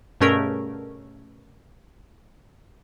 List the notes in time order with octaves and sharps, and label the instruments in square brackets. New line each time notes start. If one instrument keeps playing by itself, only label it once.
[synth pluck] G2 B2 A3 C#4 G#4 A#4